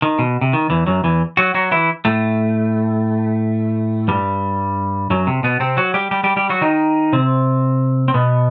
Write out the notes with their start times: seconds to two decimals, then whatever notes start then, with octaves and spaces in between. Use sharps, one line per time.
0.02 D#3
0.19 B2
0.41 C3
0.53 D#3
0.70 E2 E3
0.87 F#2 F#3
1.04 E2 E3
1.37 F#3 F#4
1.55 F#3 F#4
1.71 E3 E4
2.05 A2 A3
4.08 G2 G3
5.10 F#2 F#3
5.27 C3
5.43 B2 B3
5.60 C3 C4
5.77 F#3 F#4
5.94 G3 G4
6.11 G3 G4
6.24 G3 G4
6.36 G3 G4
6.49 F#3 F#4
6.61 D#3 D#4
7.13 C3 C4
8.08 C4
8.14 B2 B3